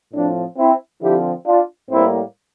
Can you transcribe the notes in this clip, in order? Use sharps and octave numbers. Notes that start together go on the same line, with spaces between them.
A2 F3 C4 D4
C4 E4
D3 F3 C4 E4 G4
D4 F4
A2 G3 A#3 C4 E4